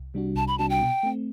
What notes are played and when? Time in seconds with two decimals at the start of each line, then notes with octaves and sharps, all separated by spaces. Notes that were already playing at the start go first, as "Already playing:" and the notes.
Already playing: C2
0.14 C3 G3 D4 F#4
0.36 C2 A5
0.48 B5
0.59 C3 G3 D4 F#4 A5
0.70 G5
0.81 B2
1.03 A3 C4